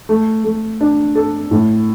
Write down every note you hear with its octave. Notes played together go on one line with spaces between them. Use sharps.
A3
A3
D4
A4
A2